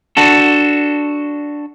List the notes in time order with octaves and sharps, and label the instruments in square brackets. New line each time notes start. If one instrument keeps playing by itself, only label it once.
[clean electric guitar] D4 F#4 A4